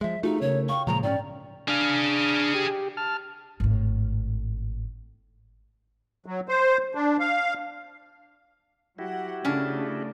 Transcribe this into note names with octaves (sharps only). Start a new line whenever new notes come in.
F3 G#3 E5
A3 D#4 F4 F#4 G#4
C#3 A#4 C#5
F5 G5 C#6
A#2 C#3 F3 G#3 A#5
G#2 C4 C#4 D5 G5
D4 G#4 F5
G4
A5 F6
G#1 A2
F#3
C5
D4
F5
F#3 E4 F#4 G4 F#5
C#3 A3 C#4 D4 A5